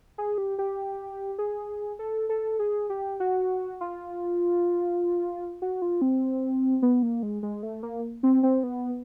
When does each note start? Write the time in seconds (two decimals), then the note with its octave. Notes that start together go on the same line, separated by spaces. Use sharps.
0.18 G#4
0.38 G4
0.59 G4
1.39 G#4
1.99 A4
2.29 A4
2.59 G#4
2.90 G4
3.20 F#4
3.81 F4
5.62 F#4
5.82 F4
6.02 C4
6.82 B3
7.03 A#3
7.23 G#3
7.43 G#3
7.63 A3
7.83 A#3
8.23 C4
8.43 C4
8.63 B3